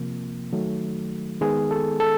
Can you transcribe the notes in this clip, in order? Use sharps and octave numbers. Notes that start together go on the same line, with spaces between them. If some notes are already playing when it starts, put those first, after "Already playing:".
Already playing: C3 F3 A#3
D#3 F#3 A3
D#3 G#3 B3 G#4
A4
A4